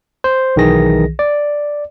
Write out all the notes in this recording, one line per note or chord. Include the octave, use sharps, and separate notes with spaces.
C5
B1 D#3 E3 G#4 A#6
D5